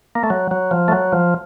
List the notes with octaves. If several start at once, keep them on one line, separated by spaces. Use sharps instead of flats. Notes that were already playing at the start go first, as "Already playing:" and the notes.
A#3
A3
F#3
F#3
F3
A3
F#3
F3